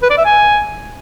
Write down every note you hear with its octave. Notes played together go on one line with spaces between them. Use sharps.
B4
D5
E5
G#5